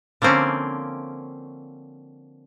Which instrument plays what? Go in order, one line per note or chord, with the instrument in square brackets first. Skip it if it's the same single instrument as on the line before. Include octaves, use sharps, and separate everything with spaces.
[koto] D3 F3 A#3 C4 C#4